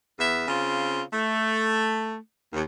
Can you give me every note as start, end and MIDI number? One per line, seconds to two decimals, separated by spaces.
0.18 0.45 40
0.18 0.45 59
0.18 0.45 76
0.48 1.01 49
0.48 1.01 60
0.48 1.01 65
1.12 2.14 57
2.53 2.62 39